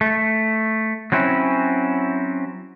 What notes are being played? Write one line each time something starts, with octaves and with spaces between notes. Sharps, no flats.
A3
F#3 C4 C#4 E4